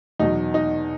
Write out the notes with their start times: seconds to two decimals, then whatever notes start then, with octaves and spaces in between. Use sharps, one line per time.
0.20 E2 B2 F#3 D#4
0.54 D#4